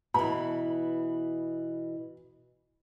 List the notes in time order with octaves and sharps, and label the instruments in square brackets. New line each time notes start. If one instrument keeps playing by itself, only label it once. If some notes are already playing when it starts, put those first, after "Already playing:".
[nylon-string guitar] B2 E3 [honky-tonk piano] B5